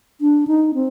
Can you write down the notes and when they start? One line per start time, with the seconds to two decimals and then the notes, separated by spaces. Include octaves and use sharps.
0.21 D4
0.47 D#4
0.74 C4